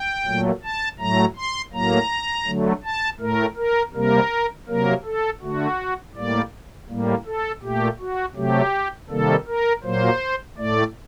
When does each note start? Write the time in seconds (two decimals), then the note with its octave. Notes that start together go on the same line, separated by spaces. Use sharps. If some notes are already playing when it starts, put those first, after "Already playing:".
Already playing: G5
0.25 A#2 F#3 A3
0.63 A5
0.99 A2 F#3 A3 A#5
1.36 C6
1.73 A2 F#3 A#3 A#5
2.47 D3 F#3 A3
2.84 A5
3.20 A2 A3 A#4
3.57 A#4
3.94 C3 G3 A#3 A#4
4.68 C3 F#3 A#3 A#4
5.04 A4
5.41 D3 A3 F#4
6.15 A2 G3 A#3 D5
6.89 A2 G3 A#3
7.26 A4
7.62 A#2 A3 G4
8.00 F#4
8.36 C3 F#3 A3 G4
9.10 C3 D#3 G3 A#3 A4
9.47 A#4
9.84 A#2 F#3 A#3 C5
10.57 A2 A3 D5